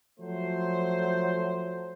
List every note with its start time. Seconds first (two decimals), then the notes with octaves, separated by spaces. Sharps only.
0.20 F3 F#3 A3 C5